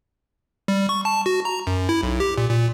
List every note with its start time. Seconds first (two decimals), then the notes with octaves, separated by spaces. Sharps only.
0.68 G3
0.89 C#6
1.05 A5
1.26 F#4
1.45 A#5
1.67 F#2
1.89 E4
2.03 B1
2.20 G4
2.38 A#2
2.50 A#2